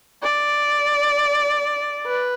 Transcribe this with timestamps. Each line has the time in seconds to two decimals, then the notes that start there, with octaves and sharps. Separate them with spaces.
0.22 D5
2.06 B4